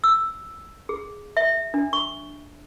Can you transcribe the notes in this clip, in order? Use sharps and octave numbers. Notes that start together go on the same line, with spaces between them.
E6
G#4
E5
D4
C#6